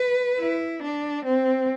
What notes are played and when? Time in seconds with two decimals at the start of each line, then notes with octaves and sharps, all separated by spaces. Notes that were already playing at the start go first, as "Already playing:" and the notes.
Already playing: B4
0.40 E4
0.83 D4
1.25 C4